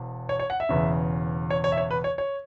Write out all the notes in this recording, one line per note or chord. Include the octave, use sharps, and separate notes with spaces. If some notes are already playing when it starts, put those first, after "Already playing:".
Already playing: E1 E2
C#5
C#5
F#5
E5
E1 E2 C#3
C#5
C#5
E5
C#5
B4
C#5
C#5